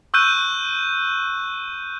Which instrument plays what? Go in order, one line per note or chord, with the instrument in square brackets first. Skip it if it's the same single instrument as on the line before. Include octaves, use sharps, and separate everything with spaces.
[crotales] C#6 E6 F#6 G6 D#7